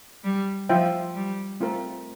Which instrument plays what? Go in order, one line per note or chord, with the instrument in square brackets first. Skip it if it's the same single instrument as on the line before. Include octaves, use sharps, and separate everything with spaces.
[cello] G3
[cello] F3 [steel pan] F4 C5 E5 G5
[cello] G3
[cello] A3 [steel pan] C4 F4 A#4